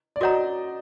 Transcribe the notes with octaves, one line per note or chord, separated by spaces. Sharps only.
D5
F#4 A#4 C#5 D#5 F#5 A#5